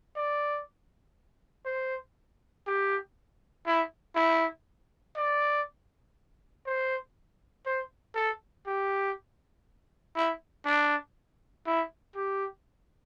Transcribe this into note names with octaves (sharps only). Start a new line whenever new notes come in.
D5
C5
G4
E4
E4
D5
C5
C5
A4
G4
E4
D4
E4
G4